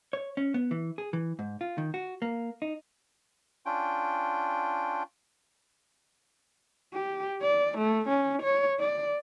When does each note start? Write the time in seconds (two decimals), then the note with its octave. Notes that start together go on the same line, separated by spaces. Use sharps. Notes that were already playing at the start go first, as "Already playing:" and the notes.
0.13 C#5
0.37 C#4
0.54 B3
0.71 E3
0.98 G#4
1.13 E3
1.39 G#2
1.61 F4
1.78 D#3
1.94 F#4
2.22 A#3
2.62 D#4
3.66 C#4 D4 F4 G5
6.94 G4
7.42 D5
7.78 A3
8.09 C#4
8.43 C#5
8.80 D5